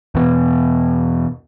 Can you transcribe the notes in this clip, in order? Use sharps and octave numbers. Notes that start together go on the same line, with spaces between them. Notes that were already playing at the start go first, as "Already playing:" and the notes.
E2 B2